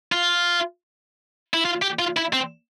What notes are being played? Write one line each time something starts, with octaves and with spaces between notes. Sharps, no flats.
F4
E4
F4
G4
F4
E4
C4